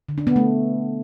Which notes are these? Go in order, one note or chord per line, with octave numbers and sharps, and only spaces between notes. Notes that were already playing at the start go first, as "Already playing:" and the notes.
D3
D4
B3
A3